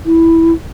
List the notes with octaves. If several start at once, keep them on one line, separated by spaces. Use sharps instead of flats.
E4